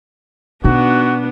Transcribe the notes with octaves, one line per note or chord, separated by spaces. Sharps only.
B2 B3 D4 D#4 F#4